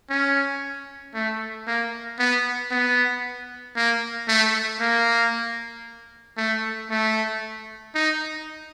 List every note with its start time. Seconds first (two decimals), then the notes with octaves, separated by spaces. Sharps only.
0.10 C#4
1.14 A3
1.67 A#3
2.19 B3
2.71 B3
3.76 A#3
4.28 A3
4.80 A#3
6.37 A3
6.90 A3
7.95 D#4